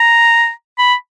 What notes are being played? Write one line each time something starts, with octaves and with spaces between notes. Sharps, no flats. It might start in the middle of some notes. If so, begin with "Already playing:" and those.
Already playing: A#5
B5